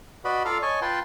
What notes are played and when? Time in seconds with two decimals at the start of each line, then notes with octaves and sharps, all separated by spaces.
0.25 F#4 B4 D5 D#5 B5
0.45 F4 A4 D5 F5 A#5 F6
0.62 C#5 D#5 G#5 A5 C#6
0.82 F4 B4 G5 A5 C6